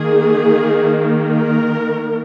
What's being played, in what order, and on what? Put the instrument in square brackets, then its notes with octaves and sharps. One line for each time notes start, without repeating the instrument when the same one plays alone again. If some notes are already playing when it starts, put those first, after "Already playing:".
Already playing: [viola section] D#3 A#3 G#4
A#4